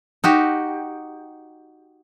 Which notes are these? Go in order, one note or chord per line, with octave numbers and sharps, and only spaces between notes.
D#4 F#4 G4